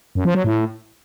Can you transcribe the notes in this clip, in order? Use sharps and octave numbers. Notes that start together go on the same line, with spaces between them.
F#2
F3
F#3
A2